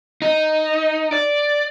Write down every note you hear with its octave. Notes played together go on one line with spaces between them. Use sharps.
D#4
D5